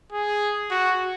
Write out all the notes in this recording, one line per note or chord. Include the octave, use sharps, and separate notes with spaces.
G#4
F#4